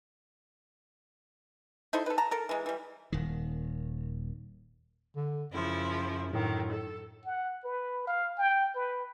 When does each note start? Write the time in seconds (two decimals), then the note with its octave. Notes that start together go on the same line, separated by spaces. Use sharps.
1.93 D#4 E4 A4 C5
2.06 A4 B4
2.18 A5 A#5
2.31 A4 A#4
2.49 E3 G#3
2.66 E3 G3
3.12 D#1 D#3
5.16 D3
5.52 F#2 C#3 F3 E4
6.33 F#2 A2 D3 D#3
6.72 A4
7.25 F#5
7.64 B4
8.07 F5
8.38 G5
8.75 B4